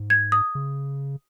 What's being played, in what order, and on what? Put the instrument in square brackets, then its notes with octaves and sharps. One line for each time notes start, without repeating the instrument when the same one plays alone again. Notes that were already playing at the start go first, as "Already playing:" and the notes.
Already playing: [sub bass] G#2
[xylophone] G#6
D#6
[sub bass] C#3